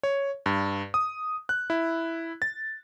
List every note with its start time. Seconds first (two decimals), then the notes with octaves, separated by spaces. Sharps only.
0.03 C#5
0.46 G2
0.94 D#6
1.49 F#6
1.70 E4
2.42 A6